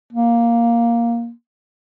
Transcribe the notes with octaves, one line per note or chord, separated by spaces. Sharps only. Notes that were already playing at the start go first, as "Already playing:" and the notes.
A#3